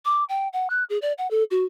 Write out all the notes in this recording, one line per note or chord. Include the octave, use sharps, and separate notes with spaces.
D6
G5
F#5
F#6
G#4
D5
F#5
A4
F#4